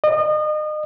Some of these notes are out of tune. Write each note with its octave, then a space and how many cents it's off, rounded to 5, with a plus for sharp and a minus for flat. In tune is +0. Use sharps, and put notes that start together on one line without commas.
D#5 -35